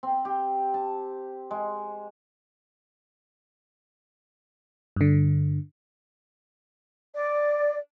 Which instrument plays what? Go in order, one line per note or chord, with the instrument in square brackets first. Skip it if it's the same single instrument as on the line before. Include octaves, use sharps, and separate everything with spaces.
[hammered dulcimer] C4
G4
A5
G#3
[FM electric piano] G2 D3
[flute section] D5